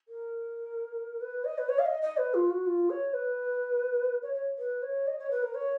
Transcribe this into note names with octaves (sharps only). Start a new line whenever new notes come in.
A#4
B4
D#5
B4
C#5
F5
D#5
D#5
B4
F4
F#4
F4
C#5
B4
C#5
C#5
B4
C#5
D#5
C#5
B4
A#4
C#5